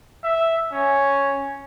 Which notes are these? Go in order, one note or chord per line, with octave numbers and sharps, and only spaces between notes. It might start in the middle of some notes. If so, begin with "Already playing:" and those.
E5
C#4